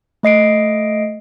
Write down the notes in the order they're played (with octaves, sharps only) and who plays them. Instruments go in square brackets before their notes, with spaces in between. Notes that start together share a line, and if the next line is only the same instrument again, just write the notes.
[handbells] A3 D#5 C7 D7